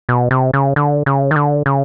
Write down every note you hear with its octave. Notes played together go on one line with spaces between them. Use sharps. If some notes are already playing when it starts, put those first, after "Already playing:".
B2
C3
C#3
D3
C#3
D#3
D3
C#3